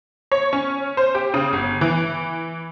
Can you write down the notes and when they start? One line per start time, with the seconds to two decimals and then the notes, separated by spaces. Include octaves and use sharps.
0.32 C#5
0.53 C#4
0.97 C5
1.15 G4
1.34 C#3
1.53 G1
1.81 E3